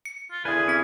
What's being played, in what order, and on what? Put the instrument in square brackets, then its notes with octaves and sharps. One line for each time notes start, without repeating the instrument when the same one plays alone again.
[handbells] C#7
[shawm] F4
[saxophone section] E2 D3 E4 [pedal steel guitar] G#4 B4 [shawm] G#5
[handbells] C4 B6